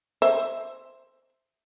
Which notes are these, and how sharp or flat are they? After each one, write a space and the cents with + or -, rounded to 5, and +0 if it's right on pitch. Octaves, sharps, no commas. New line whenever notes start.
C5 +0 E5 +0